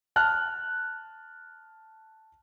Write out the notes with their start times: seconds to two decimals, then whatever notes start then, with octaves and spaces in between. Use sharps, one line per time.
0.16 A5 F6 F#6